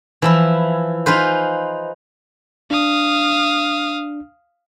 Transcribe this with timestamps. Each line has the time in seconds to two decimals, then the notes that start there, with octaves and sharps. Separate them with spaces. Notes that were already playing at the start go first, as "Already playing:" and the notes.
0.22 E3 F3 E4
1.06 D#4 F4 G#4 B4 C5
2.71 D4 F5 D#6